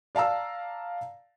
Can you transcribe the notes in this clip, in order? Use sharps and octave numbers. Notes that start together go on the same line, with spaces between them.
D5 F5 A5 A#5 E6